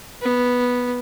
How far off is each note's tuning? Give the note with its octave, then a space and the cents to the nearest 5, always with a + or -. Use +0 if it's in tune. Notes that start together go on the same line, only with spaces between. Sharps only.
B3 -5